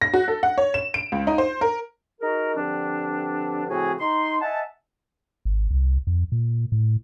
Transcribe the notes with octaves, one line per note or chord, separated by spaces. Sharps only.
A#6
F#4
A4
F#5
C#5
E7
D7
C#2
D#4
C5
A#4
D#4 F#4 G#4 A#4
G2 D3 F3 C4 D4
A2 C#3 F3 C4 F#4 G#4
D#4 C6
D#5 E5 F#5 G#5 A5
G#1
C2
F2
A#2
A2